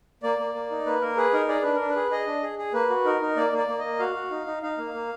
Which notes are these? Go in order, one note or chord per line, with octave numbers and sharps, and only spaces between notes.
A#3 D5
A#3
A#3
D#4
A#3 B4
A#3 A#4
G#4 B4
D#4 A#4
G#4 D5
D4 B4
D4 A#4
B4
G#4
G#4 D#5
D4
G#4
G#4
A#3 B4
F#4
D#4 A#4
D#4
A#3 D5
A#3
D5
A#3
A#3 D#5
F#4 F5
F#4
D#4
D#4
D#4 F5
A#3
A#3